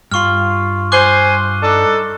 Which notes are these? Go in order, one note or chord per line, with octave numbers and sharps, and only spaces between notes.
G2 F4 C6 C#6 F6
C5 G#5 D6 F#6 G7
D4 D#4 A4